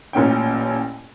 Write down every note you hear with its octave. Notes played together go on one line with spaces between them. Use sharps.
A1 A#2 C#4 G5